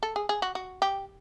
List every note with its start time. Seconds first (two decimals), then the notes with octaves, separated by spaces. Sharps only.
0.03 A4
0.16 G#4
0.29 G#4
0.42 F#4
0.55 F#4
0.82 G4